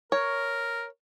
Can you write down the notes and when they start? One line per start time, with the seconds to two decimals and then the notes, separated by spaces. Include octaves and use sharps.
0.12 A#4 C#5